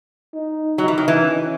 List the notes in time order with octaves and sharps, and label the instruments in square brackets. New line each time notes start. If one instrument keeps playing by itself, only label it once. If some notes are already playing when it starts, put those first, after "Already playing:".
[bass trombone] D#4
[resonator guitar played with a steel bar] F#3 [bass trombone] D#4
[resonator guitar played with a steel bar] E3
D#3
E3
[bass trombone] C#4